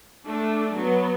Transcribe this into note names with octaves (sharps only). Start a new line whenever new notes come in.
A3 D4
F#3 B3